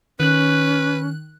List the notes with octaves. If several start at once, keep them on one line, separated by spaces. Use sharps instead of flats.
D#3 C#4 B4 F#6